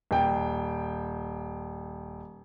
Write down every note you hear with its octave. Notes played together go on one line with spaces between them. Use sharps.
D#1 G5